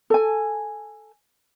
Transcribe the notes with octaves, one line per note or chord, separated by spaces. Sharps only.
A4 G#5